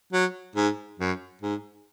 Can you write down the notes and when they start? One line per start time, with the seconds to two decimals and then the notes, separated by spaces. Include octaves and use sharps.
0.13 F#3
0.56 G#2
0.99 F#2
1.41 G#2